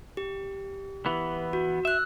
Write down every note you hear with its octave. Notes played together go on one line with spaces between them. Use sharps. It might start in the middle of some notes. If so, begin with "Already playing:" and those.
G4
E3 B3
F#4
E5 E6 F#6